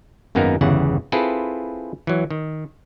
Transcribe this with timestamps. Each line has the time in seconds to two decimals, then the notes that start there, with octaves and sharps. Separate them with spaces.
0.35 G#1 F#2 A#3 B3 D#4 A#4
0.61 G1 E2 C#3 E3 F#5
1.12 C4 E4 F4 G#4 A4 B4
2.07 E3 F#3
2.31 D#3